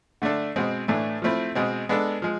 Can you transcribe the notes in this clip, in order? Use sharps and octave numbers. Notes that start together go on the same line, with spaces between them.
D3 A3 D4 A4
B2 G#3 C4
A2 E3 A3 D4
F3 A3 C4 E4
B2 G#3 C4
G#3 B3 D4 A4
F3 G#3